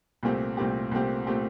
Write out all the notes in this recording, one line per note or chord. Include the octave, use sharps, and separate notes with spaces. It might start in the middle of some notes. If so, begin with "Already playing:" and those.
C2 A#2 A3 C4 G4
C2 A#2 A3 C4 G4
C2 A#2 A3 C4 G4
A#2 A3 C4 G4